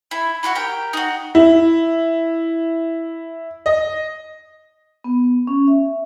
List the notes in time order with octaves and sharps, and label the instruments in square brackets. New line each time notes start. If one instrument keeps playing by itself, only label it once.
[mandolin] E4
E4 F#4 F#5 C#6
G4 A#4 G5
D#4 F#4
[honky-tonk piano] E4
D#5
[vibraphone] B3
C#4
E5